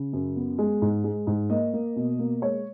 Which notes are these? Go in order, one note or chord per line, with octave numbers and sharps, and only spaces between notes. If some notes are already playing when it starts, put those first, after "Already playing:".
Already playing: C#3
F#2
B3
G#3
G#2
G#3
G#2
A#3 D#5
A#3
B2
A#3
G#3 C#5